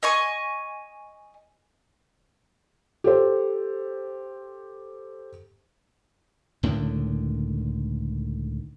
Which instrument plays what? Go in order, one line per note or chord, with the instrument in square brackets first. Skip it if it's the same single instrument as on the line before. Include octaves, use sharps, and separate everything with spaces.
[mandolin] D#5 G#5 C#6
[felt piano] G4 A4 C5
[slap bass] C#2 A2 D3 D#3